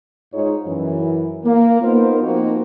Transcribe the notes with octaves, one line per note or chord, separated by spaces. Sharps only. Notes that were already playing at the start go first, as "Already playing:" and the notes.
G#2 D#4 F4 G#4 C#5
F#2 E3
A#3
B3 D#4 F4 A#4 C5
F3 A#3 C4 D#4 F#4